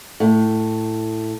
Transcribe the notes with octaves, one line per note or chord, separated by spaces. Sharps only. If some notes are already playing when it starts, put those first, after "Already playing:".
A2